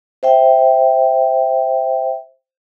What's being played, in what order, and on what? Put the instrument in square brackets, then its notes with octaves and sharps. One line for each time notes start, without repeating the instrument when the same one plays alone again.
[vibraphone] C5 E5 G5